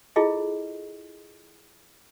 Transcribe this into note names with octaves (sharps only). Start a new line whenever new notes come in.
E4 F4 G#4 A4 D#5